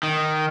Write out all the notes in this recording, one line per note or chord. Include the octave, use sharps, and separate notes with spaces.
D#3